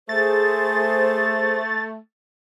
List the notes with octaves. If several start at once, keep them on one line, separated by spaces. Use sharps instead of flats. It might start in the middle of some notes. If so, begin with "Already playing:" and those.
A3 G#4 C5 A6